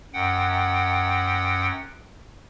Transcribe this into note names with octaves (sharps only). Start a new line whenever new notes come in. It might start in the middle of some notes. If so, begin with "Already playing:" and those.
F#2 F#5 G5